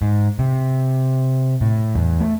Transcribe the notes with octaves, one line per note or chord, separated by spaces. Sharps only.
G#2
C3
A2
E2
A3